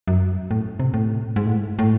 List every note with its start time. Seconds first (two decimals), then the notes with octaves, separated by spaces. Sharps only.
0.08 F#2
0.51 A2
0.80 C3
0.94 A2
1.36 G#2
1.46 A2
1.57 G#2
1.79 A2